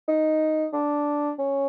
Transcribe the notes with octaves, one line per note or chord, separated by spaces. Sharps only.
D#4
D4
C#4